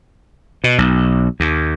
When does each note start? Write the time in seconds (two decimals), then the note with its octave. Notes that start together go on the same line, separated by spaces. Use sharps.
0.64 B2
0.78 B1
1.40 D#2